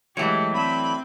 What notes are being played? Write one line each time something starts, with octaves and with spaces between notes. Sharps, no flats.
E3 F#3 G#3 A3 G4 C#5
D3 A3 C4 E5 B5